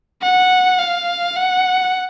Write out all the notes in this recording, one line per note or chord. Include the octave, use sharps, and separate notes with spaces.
F#5
F5
F#5